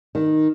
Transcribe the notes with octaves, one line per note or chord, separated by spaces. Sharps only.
D#3